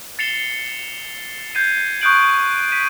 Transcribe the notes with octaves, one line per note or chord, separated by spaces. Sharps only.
A6 C7 C#7 E7 F7 G7
G6 G#6 C7 D#7
C#6 D#6 F#6 G6 D7 F#7
B6 D#7